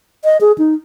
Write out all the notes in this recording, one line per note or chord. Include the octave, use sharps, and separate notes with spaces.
D#5
G#4
D#4